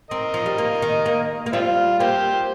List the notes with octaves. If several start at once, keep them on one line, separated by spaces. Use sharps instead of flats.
C4 A#4 D#5
F3
G3
A#3
D#3
A#3
A#3
G3 C4 F4
A#3 G4 C5